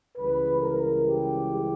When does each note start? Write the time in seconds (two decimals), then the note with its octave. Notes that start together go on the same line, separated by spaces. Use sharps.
0.17 C#2 C#3 E3 G3 B4
0.60 A#4
1.04 G4